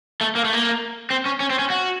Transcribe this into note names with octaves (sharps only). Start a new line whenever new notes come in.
A3
A#3
A3
A#3
C4
C#4
C#4
C4
C#4
F#4